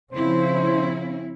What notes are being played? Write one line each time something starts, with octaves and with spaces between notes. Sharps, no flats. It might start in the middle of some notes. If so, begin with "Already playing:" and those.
C#3 F3 C4 C#4 E4 C5